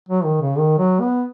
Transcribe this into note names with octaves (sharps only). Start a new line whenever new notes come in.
F#3
D#3
C#3
D#3
F#3
B3